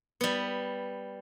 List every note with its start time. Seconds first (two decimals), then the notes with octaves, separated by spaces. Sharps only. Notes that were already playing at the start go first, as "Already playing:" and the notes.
0.21 G3 B3